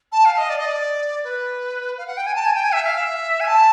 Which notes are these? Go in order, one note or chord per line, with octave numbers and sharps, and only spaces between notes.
A5
F5
D#5
D5
D#5
D5
B4
F5
F#5
G5
G#5
A5
G#5
G5
G#5
E5
F5
E5
G#5
A5